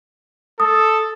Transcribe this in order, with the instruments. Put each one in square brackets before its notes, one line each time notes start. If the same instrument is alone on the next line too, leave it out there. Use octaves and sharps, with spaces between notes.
[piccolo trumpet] A4 [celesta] D#6